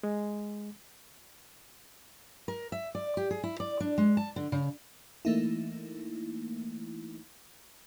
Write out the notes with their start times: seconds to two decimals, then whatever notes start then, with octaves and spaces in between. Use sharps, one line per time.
0.03 G#3
2.48 A#4
2.72 E5
2.95 D5
3.17 G4
3.31 G#4
3.43 E4
3.60 D5
3.80 D4
3.98 G#3
4.17 A5
4.36 D3
4.52 C#3
5.25 E3 A3 A#3 D#4 E4